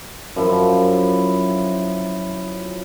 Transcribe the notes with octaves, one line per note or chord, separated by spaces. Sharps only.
F#2 F3 E4 E5